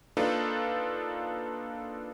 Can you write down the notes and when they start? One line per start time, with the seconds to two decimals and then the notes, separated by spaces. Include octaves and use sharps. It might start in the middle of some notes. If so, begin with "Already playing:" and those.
0.17 A#3 D4 D#4 F4 A4 B4